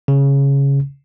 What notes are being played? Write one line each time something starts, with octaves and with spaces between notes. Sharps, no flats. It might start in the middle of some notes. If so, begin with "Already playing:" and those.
C#3